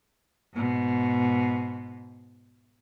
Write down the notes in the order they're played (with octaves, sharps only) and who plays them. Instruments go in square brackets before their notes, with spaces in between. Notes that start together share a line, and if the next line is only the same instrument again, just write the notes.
[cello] G#2 B2